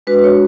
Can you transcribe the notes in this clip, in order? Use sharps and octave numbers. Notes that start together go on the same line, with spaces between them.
G#3 D4 F#4 B4
C#5